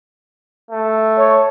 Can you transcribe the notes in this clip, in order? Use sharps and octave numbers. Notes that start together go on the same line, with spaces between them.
A3
C#5